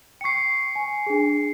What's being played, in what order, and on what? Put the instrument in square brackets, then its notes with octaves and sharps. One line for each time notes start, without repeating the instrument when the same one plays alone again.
[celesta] G5 C#6 [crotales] C7 C#7
[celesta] G#5
D4 G#4